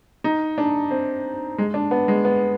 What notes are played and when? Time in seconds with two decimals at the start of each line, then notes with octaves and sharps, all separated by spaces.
0.24 D#4
0.58 D4
0.91 C4
1.58 G#3
1.74 D4
1.91 B3
2.08 G#3
2.24 B3